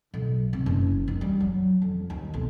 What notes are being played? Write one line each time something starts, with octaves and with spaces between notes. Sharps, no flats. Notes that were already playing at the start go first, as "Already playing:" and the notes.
B1
C3
F#1
D#3
G3
F#3
F2
D#2
B1